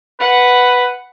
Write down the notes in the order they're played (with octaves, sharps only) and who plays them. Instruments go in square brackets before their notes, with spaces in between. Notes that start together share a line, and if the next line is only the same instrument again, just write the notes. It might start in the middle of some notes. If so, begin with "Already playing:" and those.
[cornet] B4 [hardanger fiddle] F#5